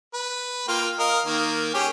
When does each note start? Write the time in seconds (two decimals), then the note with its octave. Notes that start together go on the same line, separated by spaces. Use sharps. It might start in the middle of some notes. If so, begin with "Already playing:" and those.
0.14 B4
0.68 A#3 F4 G5
0.99 A#4 D#5 F5
1.26 D#3 A#3
1.74 C#4 G4 G#4